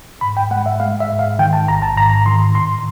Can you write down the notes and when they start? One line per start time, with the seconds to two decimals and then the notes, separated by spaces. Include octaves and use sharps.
0.21 G#2 B5
0.37 G5
0.51 G#3 F#5
0.66 E5
0.80 G#3 F5
1.00 E5
1.10 G#2
1.19 F5
1.39 D#3 G5
1.53 A5
1.68 A1 A#5
1.82 A5
1.97 G#2 A#5
2.26 D#3 C6
2.55 A2 C6